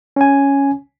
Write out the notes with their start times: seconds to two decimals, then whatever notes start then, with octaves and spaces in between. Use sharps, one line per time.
0.16 C#4 G#5